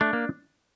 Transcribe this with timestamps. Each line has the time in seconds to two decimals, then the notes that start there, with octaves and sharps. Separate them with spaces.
0.01 A3 D4
0.13 A#3